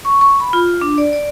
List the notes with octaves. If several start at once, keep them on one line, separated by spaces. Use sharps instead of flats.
C#6
C#6
B5
F4
D4
D5
D5